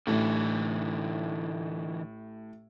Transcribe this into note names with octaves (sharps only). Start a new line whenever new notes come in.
A1 A2 D3 E3